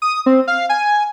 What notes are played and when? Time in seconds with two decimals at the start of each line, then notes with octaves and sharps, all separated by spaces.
0.02 D#6
0.26 C4
0.48 F5
0.69 G#5